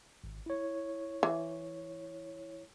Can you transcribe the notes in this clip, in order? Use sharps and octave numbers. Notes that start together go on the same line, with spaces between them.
G#1
E4 C#5
E3